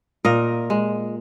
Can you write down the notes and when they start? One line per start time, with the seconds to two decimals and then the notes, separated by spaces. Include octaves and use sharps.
0.25 A#2 A#4 D#5
0.70 G#3